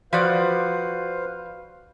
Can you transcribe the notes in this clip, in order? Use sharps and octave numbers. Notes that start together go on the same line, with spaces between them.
F3 F#4 B4 C5 D5 F5